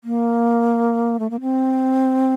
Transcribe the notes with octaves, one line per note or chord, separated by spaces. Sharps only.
A#3
A3
A#3
C4